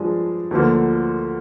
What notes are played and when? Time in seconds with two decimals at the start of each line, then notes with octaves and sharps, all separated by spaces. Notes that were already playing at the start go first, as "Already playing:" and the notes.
Already playing: G2 F3 G#3 D4 G#4
0.51 D2 D3 F3 A#3